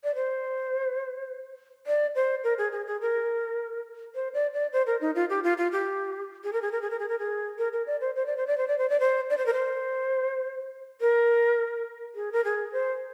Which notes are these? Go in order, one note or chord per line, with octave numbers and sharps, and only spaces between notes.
D5
C5
D5
C5
A#4
G#4
G#4
G#4
A#4
C5
D5
D5
C5
A#4
D#4
F4
G4
F4
F4
G4
G#4
A#4
G#4
A#4
G#4
A#4
G#4
A#4
G#4
A#4
A#4
D5
C5
C5
D5
C5
D5
C5
D5
C5
D5
C5
D5
C5
A#4
C5
A#4
G#4
A#4
G#4
C5